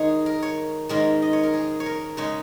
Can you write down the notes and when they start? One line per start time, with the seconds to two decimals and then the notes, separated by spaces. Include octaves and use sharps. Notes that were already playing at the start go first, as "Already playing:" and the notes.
Already playing: D#3 G#3 D#4 G#4 C#5
0.26 A#4
0.42 C#5
0.89 G#2 D#3 G#3 C#4 A#4
1.22 D#5
1.33 C#5
1.43 A#4
1.54 G#4
1.80 C#5
1.86 A#4
2.17 C#3 G#3 D#4 C#5